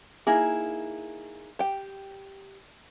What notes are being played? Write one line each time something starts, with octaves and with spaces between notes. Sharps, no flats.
A#3 D#4 E4 G#4
G4 G5